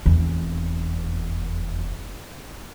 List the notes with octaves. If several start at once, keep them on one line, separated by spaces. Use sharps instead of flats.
F1 E2